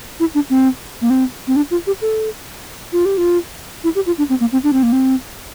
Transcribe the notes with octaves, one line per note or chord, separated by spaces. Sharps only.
E4
D4
C4
A#3
C4
C4
D4
F4
G4
A4
F4
G4
F4
E4
G4
F4
D4
C4
A#3
C4
D4
C4
A#3
C4